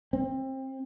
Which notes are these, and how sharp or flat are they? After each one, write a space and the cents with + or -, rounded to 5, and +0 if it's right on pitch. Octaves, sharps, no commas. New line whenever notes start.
C4 +25